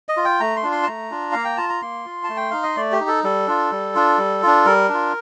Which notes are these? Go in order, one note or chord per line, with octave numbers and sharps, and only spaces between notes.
D#5
F4
G5
A3 A#5
C6
D4 F4
C6
A5
A3 A#5
D4 F4
A#3 F5
G5
F4 A5
A#5
A#3 C6
F4
A5
A3
G5
D#4 F5
D#5
A3 D5
G4
D#4
A4
G3 A4
D4 F4
G3
D4 F4
G3
D4 F4
G3 A#4
D4 F4